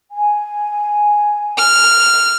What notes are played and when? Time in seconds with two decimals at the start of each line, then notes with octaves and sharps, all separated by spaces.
0.11 G#5
1.58 F6